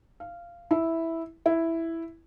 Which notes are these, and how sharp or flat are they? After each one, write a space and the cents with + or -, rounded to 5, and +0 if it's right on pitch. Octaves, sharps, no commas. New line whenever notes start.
F5 -15
E4 -5
E4 +0